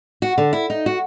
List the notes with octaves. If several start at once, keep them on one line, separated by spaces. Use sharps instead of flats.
F#4
D3
E4
D#4
F#4